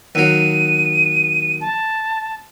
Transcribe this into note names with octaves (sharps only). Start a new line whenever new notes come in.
D#2 F#3 D#7
A5